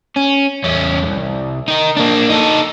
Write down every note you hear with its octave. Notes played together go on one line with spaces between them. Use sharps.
C#4
E2 C#4
C2 F2
D#4 A#4
A#3 D4
D#4 A4